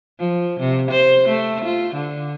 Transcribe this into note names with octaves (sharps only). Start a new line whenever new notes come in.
F3
C3
C5
A3
F4
D3